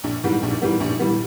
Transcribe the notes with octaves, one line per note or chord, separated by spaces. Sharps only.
A#1
G#2 E3 G3 B3
A#1
G#2 E3 G3 B3
A#1
E3 G3 B3